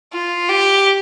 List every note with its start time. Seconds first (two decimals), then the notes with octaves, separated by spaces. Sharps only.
0.12 F4
0.49 G4